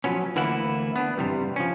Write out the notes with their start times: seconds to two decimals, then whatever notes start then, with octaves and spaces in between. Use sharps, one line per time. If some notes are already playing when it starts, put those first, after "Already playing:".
0.04 F3 F#3 B3 C#4
0.36 D2 E3 A#3 B3 E4 F#5
0.96 B3 D4
1.18 G2 C3 E3 G3
1.56 F3 C#4